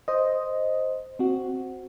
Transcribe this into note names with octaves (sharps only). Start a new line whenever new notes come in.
C5 D#5
C4 F#4